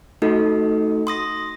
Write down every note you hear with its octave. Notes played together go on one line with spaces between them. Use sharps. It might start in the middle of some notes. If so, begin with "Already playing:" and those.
A3 D#4 F#4 A4
C6 D#6 A#6